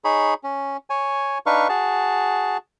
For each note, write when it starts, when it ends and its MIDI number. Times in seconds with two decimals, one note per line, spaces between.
0.04 0.34 63
0.04 0.34 68
0.04 0.34 73
0.04 0.34 83
0.44 0.77 61
0.90 1.38 73
0.90 1.38 80
1.46 1.68 62
1.46 1.68 63
1.46 1.68 71
1.46 1.68 77
1.46 1.68 85
1.69 2.57 66
1.69 2.57 68
1.69 2.57 81